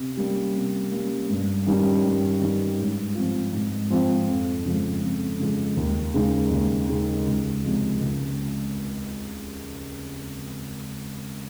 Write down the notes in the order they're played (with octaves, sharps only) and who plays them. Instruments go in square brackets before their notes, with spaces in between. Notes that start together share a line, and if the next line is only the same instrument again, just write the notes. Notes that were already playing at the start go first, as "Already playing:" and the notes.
Already playing: [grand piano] C3
G3 A#3 C#4
C3
G3 A#3 C#4
G2
D#3 G3 C#4
G2
D#3 G3 C#4
G#2
F3 C4 F4
G#2
F3 C4 F4
F2
C#3 F3 G#3
F2
C#3 F3 G#3
D#2
C#3 G#3 D#4 G#4
D#2
C#3 G#3 D#4 G#4
C#2
C3 F3 G#3
C#2